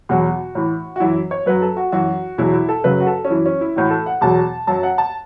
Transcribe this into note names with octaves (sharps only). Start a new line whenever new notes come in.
E2 B2 F#3 F#4
A2 E3
F#4
F#2 E3 E4
C#5
F#2 F#3 B4
A4
F#4
F#2 E3 F#4
E2 B2 F#3 E4
E4
A4
F#2 C#3 F#3 B4
F#4
A4
C#4
F#2 E3 E4
C#4
E4
A2 E3 F#4
A4
F#5
E2 B2 F#3 A5
F#2 F#3 A5
F#5
A5